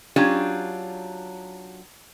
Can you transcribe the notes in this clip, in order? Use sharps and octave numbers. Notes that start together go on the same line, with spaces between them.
F#3 C#4 D4 F4 G4